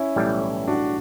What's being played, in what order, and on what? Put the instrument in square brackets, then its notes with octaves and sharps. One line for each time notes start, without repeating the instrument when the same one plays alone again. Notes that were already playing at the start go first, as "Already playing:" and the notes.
Already playing: [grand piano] C#4 E4
[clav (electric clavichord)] B1 A2 E3 G3
[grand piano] D4 F#4